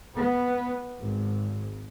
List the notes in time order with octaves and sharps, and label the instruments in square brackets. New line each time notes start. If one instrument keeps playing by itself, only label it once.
[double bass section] B3
G#1